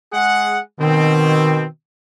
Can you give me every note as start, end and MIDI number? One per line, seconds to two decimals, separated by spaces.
0.12 0.60 56
0.12 0.60 68
0.12 0.60 78
0.80 1.64 47
0.80 1.65 51
0.80 1.64 60